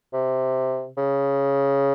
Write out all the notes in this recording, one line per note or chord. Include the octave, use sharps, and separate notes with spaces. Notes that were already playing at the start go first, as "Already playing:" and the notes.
C3
C#3